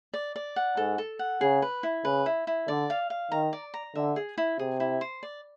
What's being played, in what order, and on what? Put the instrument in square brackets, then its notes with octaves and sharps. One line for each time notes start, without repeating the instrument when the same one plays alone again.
[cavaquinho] D5
D5
F#5
[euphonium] G#2 [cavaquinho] A4
[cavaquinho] A4
F#5
[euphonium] C#3 [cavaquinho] G#4
[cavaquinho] B4
E4
[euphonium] C#3 [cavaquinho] B4
[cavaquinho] E4
E4
[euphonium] D3 [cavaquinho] D5
[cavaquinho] F5
F5
[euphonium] D#3 [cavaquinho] A#5
[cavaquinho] D5
A#5
[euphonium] D3 [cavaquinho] E5
[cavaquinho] G#4
E4
[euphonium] C3 [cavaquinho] G#4
[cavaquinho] E4
C5
D5